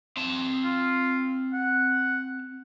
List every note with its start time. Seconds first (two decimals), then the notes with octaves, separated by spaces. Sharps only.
0.17 C4 A5
0.65 F4
1.53 F#5